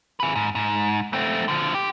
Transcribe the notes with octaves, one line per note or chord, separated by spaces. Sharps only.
G#4 B4
G#2
G#2
A3 C4
D3 F3
G4